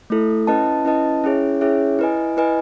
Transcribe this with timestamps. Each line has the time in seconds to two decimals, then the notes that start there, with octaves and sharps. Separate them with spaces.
0.10 A3 E4 A4
0.47 C#4 E4 B4 D#5 A5
0.85 C#4 E4 B4 D#5 A5
1.24 C#4 E4 G#4 C#5 E5
1.61 C#4 E4 G#4 C#5 E5
1.99 E4 B4 D#5 G#5
2.37 E4 B4 D#5 G#5